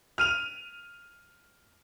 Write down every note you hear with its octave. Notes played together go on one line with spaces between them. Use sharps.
F6 D#7 F7